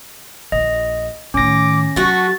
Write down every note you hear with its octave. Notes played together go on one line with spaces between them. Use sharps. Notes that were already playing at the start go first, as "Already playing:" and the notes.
A#1 D#5
A2 D#3 C#4 D6 A#6
F#3 A3 F#4 A6